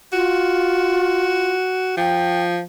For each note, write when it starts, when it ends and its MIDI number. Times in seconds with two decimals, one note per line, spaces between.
0.13 1.53 65
0.13 1.96 66
1.97 2.62 53
1.97 2.42 79